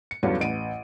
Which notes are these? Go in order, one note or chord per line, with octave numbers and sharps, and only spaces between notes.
C#7
E2 G2 D3 F#3 C#4 F4
A1 D7 D#7